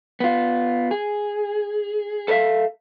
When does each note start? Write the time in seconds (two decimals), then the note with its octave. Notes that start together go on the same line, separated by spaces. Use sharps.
0.20 B3 F4
0.91 G#4
2.28 A4 B4 D5 E5 F5